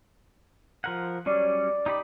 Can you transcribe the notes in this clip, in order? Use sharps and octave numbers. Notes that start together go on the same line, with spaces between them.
F3 A#4 F#5
F#3 G3 C#4 D5
D#4 G4 B5